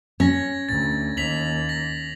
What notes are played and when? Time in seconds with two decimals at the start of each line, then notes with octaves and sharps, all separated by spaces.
0.20 C#4 G#6 A#6
0.69 D2 A6
1.17 D#2 B6 F7 F#7
1.69 A#6